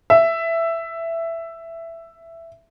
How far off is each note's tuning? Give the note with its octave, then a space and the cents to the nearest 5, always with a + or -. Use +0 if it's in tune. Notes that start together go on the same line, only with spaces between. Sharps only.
E5 +10